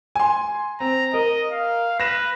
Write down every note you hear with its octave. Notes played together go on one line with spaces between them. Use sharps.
G#5 C6
C4 A#5
A#4 D#5
F5
B4 A#6 E7